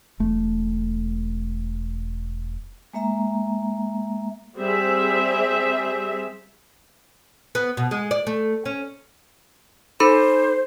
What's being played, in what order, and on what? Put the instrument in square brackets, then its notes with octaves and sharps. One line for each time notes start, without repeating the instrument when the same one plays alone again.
[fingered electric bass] E1 A3
[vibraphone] G#3 A#3 E5 A#5
[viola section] G3 C4 G#4 E5
[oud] B3
B2
G#3
D5
A3
C#4
[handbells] D#4 A4 B5 [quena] C5